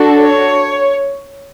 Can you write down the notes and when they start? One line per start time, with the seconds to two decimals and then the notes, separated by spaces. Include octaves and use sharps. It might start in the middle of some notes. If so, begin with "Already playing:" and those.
Already playing: D4 F#4 A4
0.20 C#5